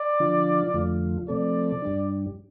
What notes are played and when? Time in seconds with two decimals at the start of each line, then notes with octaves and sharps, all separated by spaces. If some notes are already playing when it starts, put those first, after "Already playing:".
Already playing: D5
0.20 D3 F3 D4 F4
0.74 F2 D3 F3 A3 F4
1.28 C3 F3 A3 C4 A4 D5
1.82 G2 G3 D4